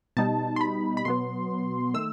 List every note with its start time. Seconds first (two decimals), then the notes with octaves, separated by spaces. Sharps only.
0.17 B2 G3 D#4 A5
0.56 C6
0.61 B5
0.97 B5
1.05 B2 F#3 B3 C6
1.94 D#3 A3 E6